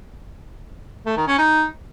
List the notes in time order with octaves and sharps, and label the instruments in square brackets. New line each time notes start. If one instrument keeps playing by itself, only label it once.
[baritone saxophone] A3
D#3
C#4
D#4